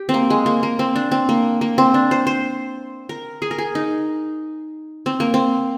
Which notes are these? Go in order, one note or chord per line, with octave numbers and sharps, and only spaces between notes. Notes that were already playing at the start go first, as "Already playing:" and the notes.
Already playing: G4
C4
A#3
G#3
A#3
A#3
C4
D4
C4
A#3
A#3
C4
D4
C5
C5
A#4
G#4
A#4
G#4
D#4
C4
A#3
C4